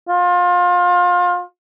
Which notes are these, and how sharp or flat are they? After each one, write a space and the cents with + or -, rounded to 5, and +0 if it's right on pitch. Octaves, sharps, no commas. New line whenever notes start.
F4 +30